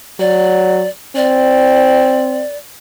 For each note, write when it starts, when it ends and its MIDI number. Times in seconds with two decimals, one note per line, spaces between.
0.20 0.85 54
0.20 0.89 74
1.16 2.43 60
1.16 2.57 74